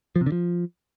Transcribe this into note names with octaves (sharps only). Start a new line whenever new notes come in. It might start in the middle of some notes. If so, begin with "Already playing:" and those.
F3
C3
D3
F3